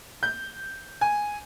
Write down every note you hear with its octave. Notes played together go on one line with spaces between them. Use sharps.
G6
G#5